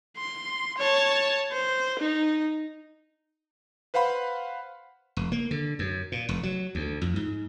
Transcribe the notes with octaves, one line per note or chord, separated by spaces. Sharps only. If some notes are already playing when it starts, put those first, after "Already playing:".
C6
C#5 A5
C5
D#4
B4 C5 F5 F#5 B5 C6
F1
A#3
D3
F#2
A#2
F1
F#3
D2
F2
G#2